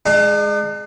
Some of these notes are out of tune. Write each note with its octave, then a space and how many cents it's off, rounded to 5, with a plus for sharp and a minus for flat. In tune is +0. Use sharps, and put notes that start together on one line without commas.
G#3 +5 D4 +45